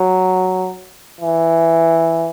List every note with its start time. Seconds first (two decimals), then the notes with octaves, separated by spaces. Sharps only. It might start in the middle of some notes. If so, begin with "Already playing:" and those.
Already playing: F#3
1.21 E3